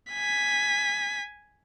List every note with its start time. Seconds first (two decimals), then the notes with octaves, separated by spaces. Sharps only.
0.11 G#5 B6